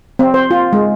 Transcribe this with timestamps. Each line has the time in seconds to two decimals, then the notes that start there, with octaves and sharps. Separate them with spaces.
0.19 C4
0.34 C5
0.51 F4
0.73 G#3